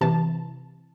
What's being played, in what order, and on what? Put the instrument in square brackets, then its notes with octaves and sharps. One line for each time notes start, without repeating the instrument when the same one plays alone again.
[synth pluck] C3 E3 A5